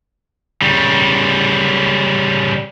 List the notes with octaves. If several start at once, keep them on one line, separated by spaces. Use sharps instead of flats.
C#3 G3